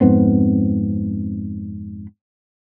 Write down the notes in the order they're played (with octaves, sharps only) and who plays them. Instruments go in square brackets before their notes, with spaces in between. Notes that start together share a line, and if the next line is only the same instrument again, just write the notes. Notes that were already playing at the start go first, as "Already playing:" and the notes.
[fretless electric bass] F2 G#2 B3 C4